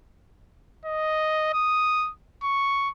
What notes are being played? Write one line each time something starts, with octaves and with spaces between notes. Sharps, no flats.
D#5
D#6
C#6